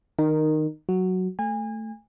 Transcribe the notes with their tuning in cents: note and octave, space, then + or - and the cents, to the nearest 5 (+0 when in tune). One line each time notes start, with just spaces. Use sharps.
D#3 +0 D#4 -20 A#4 +0
F#3 +0 F#4 +0
A3 +5 G#5 -30